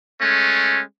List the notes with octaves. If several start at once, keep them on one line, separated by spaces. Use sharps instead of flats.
G#3 A3 C#4